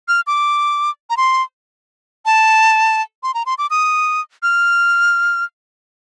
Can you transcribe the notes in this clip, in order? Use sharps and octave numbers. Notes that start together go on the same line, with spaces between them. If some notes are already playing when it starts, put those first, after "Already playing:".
F6
D6
A#5
C6
A5
C6
A#5
C6
D6
D#6
F6